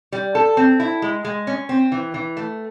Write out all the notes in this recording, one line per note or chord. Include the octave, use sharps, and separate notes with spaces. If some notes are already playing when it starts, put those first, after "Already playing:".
G3
A4
C4
E4
G#3
G#3
C#4
C4
E3
E3
A3